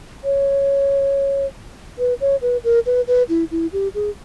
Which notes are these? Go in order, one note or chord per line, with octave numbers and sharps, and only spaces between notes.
C#5
B4
C#5
B4
A#4
B4
B4
E4
E4
G4
G#4